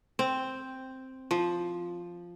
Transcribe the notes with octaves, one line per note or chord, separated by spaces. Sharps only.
C4
F3